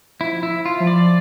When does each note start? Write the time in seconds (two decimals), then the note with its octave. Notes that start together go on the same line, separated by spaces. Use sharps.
0.19 F3 E4
0.43 E4
0.65 F4
0.80 F3
0.87 D5